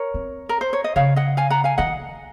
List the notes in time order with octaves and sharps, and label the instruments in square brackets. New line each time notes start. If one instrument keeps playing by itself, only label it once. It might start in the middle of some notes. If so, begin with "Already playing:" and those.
Already playing: [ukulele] A#4 C#5
[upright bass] C4
[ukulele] A#4
C5
C#5
D#5
[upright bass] C#3 [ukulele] C#5 F5
[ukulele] D#5 F#5
F5 G#5
F#5 A#5
F5 G#5
[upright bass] D#3 [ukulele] D#5 F#5